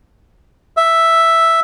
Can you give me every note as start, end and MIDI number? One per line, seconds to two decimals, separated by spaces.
0.77 1.60 76